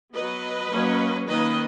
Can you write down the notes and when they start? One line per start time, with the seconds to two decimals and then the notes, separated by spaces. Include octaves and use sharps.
0.14 F#3 B3 B4 D#5
0.70 F#3 A#3 C#4
1.28 D#3 A#3 C#4 B4 D#5